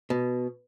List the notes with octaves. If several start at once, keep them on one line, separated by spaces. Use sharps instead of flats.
B2